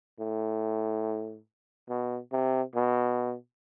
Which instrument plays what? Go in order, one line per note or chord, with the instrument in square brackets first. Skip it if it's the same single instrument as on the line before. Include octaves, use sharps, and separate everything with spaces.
[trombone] A2
B2
C3
B2